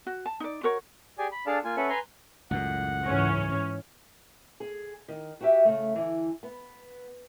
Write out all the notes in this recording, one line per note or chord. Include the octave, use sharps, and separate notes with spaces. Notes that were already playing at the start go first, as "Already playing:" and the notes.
F#4
A5
D#4 D5
F#4 A#4 C#5
G4 G#4 D5 G#5
B5
D4 G#4 A4 D5 F5 A5
A#3 F4 G#5
C#4 A4 B4 E5 F#5
B4 G#5 A#5 C6
C#2 F#2 A2 F#5
G#2 E3 C#4
G#4
D#3
F#4 G4 E5
C#3 A3
D3 E3
B3